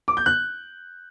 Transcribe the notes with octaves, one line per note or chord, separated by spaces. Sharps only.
D6
G6
F#6